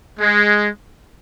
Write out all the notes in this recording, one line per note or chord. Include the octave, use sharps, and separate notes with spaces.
G#3